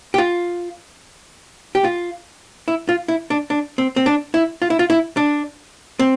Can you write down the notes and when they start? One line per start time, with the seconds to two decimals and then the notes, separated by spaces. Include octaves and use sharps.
0.14 G4
0.18 F4
1.75 G4
1.84 F4
2.68 E4
2.89 F4
3.08 E4
3.30 D4
3.50 D4
3.78 C4
3.96 C4
4.06 D4
4.34 E4
4.62 F4
4.70 E4
4.79 F4
4.90 E4
5.17 D4
5.99 C4